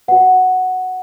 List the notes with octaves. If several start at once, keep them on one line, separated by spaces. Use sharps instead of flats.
F#4 B4 F#5